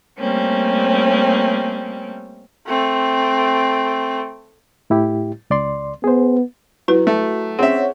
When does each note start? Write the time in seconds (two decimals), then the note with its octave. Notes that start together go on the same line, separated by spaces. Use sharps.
0.19 G3 A3 A#3 C4 C#4
2.67 A3 C4
4.90 A2 E4 G4
5.50 C#2 D5 C6
6.04 B3 G#4 C5
6.88 F#3 E4 B4
7.07 A3
7.59 C4 C#4 G#4 C#5 E5 F#5